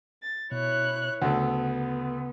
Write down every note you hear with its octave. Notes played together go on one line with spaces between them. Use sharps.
A6
B2 E4 C#5 F#6
D2 C#3 A3 B3 F#5